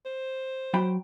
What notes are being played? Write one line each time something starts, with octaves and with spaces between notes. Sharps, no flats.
C5
F#3 G5 B5